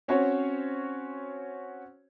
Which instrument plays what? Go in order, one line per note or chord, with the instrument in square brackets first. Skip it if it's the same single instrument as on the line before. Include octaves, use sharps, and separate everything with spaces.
[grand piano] C4 C#4 F#4 C5 C#5